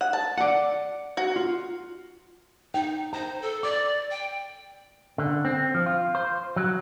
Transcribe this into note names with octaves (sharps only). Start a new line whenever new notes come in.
F#5
A5
D5 F#5
F#4
F4
D#4 G5
C5 A#5
A4
D5 D6
G5
D3
C4
F3
F4
C5
F#3